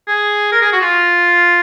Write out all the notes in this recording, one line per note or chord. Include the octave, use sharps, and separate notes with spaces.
G#4
A#4
G#4
F#4
F4